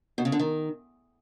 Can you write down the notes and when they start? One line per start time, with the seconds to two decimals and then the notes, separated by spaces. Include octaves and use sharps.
0.18 B2
0.25 C#3
0.32 D3
0.39 D#3